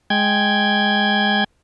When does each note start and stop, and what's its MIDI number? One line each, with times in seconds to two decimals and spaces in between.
0.10 1.44 56
0.10 1.44 79
0.10 1.44 92